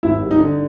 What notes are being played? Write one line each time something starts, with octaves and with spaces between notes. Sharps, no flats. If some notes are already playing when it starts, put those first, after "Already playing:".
G#1 E4
G3
D#4
D3